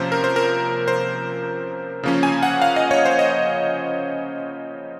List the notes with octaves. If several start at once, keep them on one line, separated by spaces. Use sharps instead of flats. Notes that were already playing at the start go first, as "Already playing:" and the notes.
Already playing: C3 F3 A#3 C#4 C5
A#4
C5
A#4
C5
C#3 F3 A#3 C#4
G#5
F#5
F5
D#5
C#5
C5
D#5